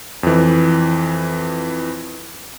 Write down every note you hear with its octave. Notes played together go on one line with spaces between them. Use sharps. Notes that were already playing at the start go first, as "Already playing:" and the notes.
F2 E3